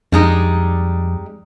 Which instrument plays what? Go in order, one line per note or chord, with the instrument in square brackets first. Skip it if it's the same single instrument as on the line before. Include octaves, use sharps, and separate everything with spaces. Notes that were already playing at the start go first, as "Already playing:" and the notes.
[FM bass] F2 [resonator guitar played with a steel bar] G3 G#3 D#4